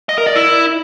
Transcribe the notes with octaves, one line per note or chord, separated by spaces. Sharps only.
D#5
A#4
D5
E4